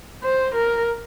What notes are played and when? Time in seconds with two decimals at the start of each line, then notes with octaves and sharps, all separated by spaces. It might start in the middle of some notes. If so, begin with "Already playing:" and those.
0.24 C5
0.55 A#4